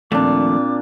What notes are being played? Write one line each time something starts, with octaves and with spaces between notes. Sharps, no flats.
D#2 A#2 F3 A3 C4 D4 D6